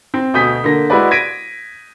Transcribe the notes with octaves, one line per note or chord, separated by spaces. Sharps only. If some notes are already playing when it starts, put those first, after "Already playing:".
C4
D2 B2 D#6 G6 B6
D3 A#3 A#6
G#3 E4 F#4 B4 D5
G#6 A#6 B6 D7 D#7